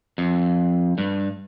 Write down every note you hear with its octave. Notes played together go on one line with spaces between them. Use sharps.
F2
G2